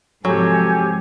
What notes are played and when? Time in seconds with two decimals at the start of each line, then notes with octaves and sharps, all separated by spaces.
0.25 G#2 C3 F3 F#3 G4 A4 G#5